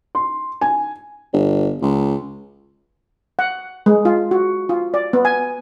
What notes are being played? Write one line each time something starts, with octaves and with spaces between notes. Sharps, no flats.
C6
G#5
G1
C#2
F#5
G#3
F4
F#4
F4
D5
B3
G#5